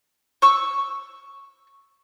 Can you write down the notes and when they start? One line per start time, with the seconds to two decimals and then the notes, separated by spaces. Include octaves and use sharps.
0.42 C#6 E6